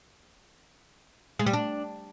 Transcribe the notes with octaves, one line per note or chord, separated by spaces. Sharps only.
G#3
G3
D4